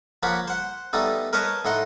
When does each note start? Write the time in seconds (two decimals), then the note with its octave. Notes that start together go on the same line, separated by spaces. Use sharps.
0.23 F3 A#3 C#5 F#5 B5
0.48 C5 F#5
0.93 G3 A3 B3 D#4
1.33 A#4 B4 C#5 D#5 A5 A#5
1.65 A2 D#4 F#5 C6